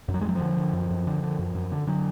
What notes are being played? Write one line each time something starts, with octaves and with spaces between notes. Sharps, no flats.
F#2
F#3
G#3
F#2 F#3
F3
D3
D3
F#2
F#2
D3
D3
F#2
F#2
D3
D3 F#3